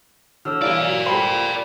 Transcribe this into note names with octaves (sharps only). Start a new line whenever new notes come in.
D3 C#5 E6 F6
E3 G3 E4 A#4 D5 F5 G#5 A#5
F#3
G3 F4 A4 C5 G5 B5